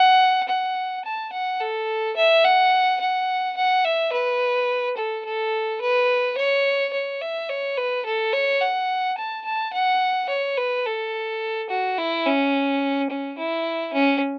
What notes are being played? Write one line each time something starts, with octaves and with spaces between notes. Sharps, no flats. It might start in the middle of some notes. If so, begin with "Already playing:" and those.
Already playing: F#5
F#5
A5
F#5
A4
E5
F#5
F#5
F#5
E5
B4
A4
A4
B4
C#5
C#5
E5
C#5
B4
A4
C#5
F#5
A5
A5
F#5
C#5
B4
A4
F#4
E4
C#4
C#4
E4
C#4